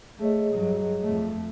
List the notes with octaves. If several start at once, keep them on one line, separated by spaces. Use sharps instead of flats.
A3 G#4 C#5 D#5
G2 F#3
F2 A3